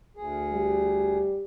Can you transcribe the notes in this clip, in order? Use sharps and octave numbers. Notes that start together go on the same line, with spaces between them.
D2 G#4
G3